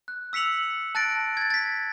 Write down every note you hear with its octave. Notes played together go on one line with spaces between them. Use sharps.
F#6
E6 B6 C#7 F7 F#7
A5 F#6 A6 A#6 D7
G#6 A6
A6 B6